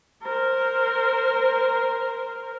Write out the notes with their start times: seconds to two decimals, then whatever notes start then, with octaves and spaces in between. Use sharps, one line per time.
0.23 A#4 C5